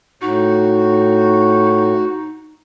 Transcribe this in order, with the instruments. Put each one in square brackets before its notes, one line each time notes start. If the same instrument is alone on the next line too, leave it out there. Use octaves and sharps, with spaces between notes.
[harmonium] A2 [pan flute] D#4 [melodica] F#4